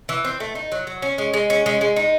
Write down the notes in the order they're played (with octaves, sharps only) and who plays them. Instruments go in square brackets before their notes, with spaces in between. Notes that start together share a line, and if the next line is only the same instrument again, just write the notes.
[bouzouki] E3
C4
A3
D#4
F#3
F#3
C#4
G#3
G#3
C#4
G#3
G#3
D#4